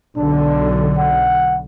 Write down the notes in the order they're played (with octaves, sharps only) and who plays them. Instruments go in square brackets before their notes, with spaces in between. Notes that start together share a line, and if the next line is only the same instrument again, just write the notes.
[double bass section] B1 D3 [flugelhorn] D4
[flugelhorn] F#5